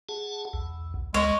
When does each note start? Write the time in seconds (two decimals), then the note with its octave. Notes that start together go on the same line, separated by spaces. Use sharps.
0.09 G#4 F#5 A5
0.53 B1 E2
1.14 D2 G#3 C#5